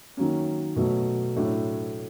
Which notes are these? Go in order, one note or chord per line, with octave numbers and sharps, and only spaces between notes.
D#3 F#3 A#3 C#4
B2 F#3 A3
A2 F#3 A3 D4